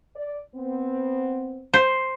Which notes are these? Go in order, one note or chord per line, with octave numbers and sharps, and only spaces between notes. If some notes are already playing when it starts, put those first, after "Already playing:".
D5
B3 C4
C5